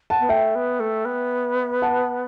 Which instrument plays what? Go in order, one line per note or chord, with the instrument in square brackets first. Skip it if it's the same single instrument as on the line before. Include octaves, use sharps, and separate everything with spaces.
[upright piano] F#5 A5
[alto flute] B3
[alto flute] A3 [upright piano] E5 G5
[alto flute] B3
A3
B3
[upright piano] F#5 A5